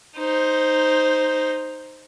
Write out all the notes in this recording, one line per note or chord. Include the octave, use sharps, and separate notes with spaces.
D#4 C5